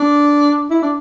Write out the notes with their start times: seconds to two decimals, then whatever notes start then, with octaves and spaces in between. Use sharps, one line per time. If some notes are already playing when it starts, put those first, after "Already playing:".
Already playing: D4
0.70 E4
0.82 D4